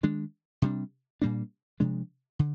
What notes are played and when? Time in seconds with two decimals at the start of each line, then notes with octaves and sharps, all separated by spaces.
0.03 D#3 G#3 D4
0.62 C3 G3 D4
1.22 A#2 G3 A#3 D4
1.80 C3 F3 G#3 D4
2.39 D3